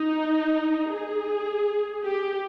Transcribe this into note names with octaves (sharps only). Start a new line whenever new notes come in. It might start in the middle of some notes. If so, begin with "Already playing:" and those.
Already playing: D#4
G#4
G4